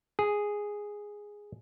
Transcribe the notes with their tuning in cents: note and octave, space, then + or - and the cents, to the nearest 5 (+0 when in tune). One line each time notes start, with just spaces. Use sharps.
G#4 -5